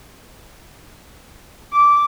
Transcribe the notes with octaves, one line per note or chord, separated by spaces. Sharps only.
D6